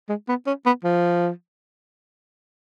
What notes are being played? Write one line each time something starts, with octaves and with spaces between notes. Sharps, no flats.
G#3
B3
C#4
B3
F3